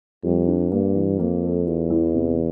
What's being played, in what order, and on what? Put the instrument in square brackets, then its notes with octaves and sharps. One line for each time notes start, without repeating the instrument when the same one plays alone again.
[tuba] F2 [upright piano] G3
[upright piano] D4
[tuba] G2 [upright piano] A#3
[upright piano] E3
[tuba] F2 [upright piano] A#3
[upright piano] A4
[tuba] E2 [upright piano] F4
[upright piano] E3
C3